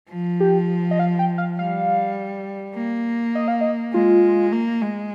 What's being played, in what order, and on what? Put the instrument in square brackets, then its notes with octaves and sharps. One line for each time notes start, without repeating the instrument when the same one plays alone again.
[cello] F3
[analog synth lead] G4
D#5
F5
G5
F5
[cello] G3 [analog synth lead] F5
[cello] A#3
[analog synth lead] D#5
F5
D#5
[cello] G#3 [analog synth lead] F4
[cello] A#3
G#3